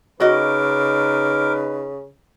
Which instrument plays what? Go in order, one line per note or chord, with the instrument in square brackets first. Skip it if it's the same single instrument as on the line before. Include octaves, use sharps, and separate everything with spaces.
[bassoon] C#3 [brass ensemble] D#4 B4 [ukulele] F#4 D#5 [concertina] A#4 D6